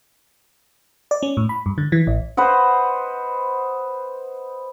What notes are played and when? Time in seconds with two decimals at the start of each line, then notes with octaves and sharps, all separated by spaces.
1.11 D5
1.23 C#4
1.37 A2
1.49 B5
1.66 G2
1.78 D3
1.92 E3
2.07 A1
2.37 B4 C5 D#5 F#5